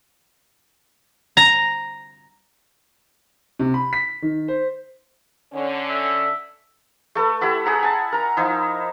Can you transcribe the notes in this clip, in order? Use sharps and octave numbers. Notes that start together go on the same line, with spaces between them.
A#5
C3
B5
B6
D#3
C5
D3 C#4
E5
A3 A4 B4
E4 G4 E5 F#5
G#4 F#5 A#5
G#5 A5
A#4 A#5
F3 D#4 E4